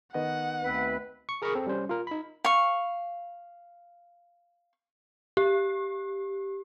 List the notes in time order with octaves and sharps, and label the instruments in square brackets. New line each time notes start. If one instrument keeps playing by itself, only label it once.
[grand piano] D#3 B3 D#5 [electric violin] F#5
[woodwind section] D2 C4 B4
[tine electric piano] C#6
G#4 A#4 A#5 B5 C#6 D#6
C4 A4
G3 C#4 C5
F4 A#4
D#4 B5
[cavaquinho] F5 C#6
[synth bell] G4